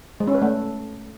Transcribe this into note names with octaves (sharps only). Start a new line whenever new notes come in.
G#3
C#4
B4
A3